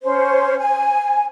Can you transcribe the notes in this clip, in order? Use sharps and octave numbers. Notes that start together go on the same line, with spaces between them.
C#4 C5
G#5